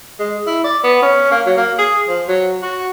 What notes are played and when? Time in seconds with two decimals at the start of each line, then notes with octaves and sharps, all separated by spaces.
0.19 G#3
0.47 E4
0.64 D5
0.84 B3
1.02 C#4
1.31 A#3
1.46 F#3
1.57 A#3
1.78 G#4
2.08 F3
2.28 F#3
2.62 F#4